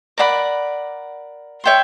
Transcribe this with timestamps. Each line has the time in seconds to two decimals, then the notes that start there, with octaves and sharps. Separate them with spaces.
0.18 A#4 D5 F#5 B5
1.64 C#5 E5 G5 C6